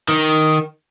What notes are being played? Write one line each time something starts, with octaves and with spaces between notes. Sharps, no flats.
D#3